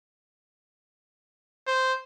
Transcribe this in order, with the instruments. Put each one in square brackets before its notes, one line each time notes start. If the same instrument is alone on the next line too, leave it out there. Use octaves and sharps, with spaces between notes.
[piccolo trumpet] C5